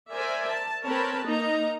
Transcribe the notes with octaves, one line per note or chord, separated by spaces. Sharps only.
A#4 C5 D5 E5 G#5
A5
C4 A#4 B4 C#5 A5 B5
A#3 D#4 D#5 A#5